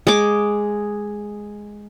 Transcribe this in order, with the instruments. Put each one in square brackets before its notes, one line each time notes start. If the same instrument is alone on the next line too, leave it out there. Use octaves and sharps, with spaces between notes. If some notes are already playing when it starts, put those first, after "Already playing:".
[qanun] G#3 D6